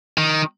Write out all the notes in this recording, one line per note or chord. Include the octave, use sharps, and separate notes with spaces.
D#3